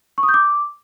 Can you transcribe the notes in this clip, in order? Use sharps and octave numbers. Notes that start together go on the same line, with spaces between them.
C#6
D#6
G6
D6